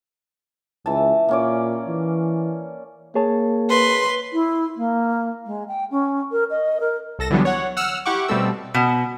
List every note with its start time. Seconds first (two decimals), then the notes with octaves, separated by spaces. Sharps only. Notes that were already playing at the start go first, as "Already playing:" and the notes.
0.86 C#2 E3 A5
1.29 A#2 A#3 C#4 D5
1.88 E3
3.15 A#3 G#4 C#5 A5
3.69 B4 C6
4.32 E4
4.76 A#3
5.45 G#3
5.68 G5
5.90 C#4
6.31 A#4
6.50 D#5
6.80 A#4
7.19 C2 A4 A#6 E7
7.30 D3 E3 F#3 G3 B3 D4
7.45 C#5 F#5
7.77 F#5 E6 F6
8.05 E4 G4 F#5 C#6 D6
8.28 B2 G3 A3 C4 A4 E6
8.74 B2